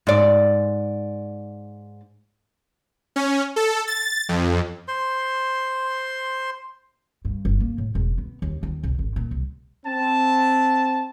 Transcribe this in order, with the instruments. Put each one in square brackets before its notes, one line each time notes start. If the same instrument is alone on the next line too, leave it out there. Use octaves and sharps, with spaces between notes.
[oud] G#2 D5
[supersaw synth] C#4
A4
A6
F2
[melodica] C5 C6
[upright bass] G2
G1
A#3
A2
E1
B3
D#2
D#2
B1
G#1
A#2
C2
[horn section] C4 A5